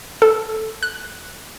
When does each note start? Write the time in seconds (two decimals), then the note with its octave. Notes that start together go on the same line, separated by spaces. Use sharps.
0.22 A4
0.83 F#6